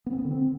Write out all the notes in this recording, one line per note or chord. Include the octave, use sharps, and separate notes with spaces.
B3
C4
B3
D3
C4